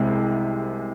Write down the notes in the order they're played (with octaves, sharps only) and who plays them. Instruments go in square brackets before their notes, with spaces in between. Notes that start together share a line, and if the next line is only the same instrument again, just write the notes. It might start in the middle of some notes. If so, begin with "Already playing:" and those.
Already playing: [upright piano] C2 C3 G#3